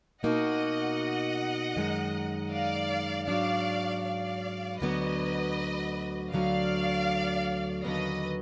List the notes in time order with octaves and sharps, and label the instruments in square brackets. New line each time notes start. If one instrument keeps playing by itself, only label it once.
[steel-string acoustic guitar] B2 A#3 D#4 F#4 [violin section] D#5 F#5
[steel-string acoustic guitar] F#2 D#3 G#3
[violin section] D5 F5
[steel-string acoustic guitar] G#2 F#3 D4 [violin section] D5 F5
[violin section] D5 F5
[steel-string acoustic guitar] D2 D3 F#3 B3 [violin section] B4 D#5
[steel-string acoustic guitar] D2 D3 F#3 [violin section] D5 F5
[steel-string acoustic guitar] D#2 D3 F#3 B3 [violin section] B4 D#5